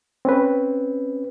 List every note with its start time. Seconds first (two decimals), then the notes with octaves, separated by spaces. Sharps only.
0.25 C4 C#4 B4